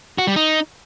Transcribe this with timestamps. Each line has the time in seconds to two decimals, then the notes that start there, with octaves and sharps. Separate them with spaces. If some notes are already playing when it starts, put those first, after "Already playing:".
0.18 F#4
0.27 G3
0.36 D#4